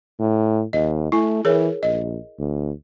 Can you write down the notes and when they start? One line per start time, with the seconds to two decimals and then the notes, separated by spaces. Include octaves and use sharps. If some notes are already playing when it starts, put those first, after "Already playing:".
0.19 A2
0.73 D#2 D#5
1.12 A3 E4 G#5
1.45 E3 G#4 A#4 C#5
1.83 A#1 D#5
2.39 D2